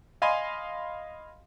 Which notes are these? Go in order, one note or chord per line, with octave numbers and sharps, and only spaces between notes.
D#5 F5 G#5 B5 C6